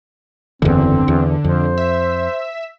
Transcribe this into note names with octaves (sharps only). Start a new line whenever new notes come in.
F#1 E2 D3 C4
E2
F2 C5
E5